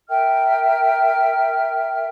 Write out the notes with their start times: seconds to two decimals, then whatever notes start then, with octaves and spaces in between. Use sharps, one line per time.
0.09 A#4 E5 G5 F6